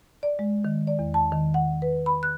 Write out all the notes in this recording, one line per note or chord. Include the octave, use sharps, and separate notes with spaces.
D5
G#3
D#3
D5
E2
A5
D#3
F#5
B4
B5
F#6